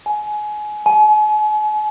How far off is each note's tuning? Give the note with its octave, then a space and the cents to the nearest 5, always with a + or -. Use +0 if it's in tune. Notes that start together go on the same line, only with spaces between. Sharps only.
G#5 +25
G#5 +45